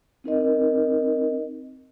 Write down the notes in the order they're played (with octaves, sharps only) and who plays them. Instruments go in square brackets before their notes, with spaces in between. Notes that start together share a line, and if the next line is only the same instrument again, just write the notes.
[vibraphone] C4 D#4 A#4 D#5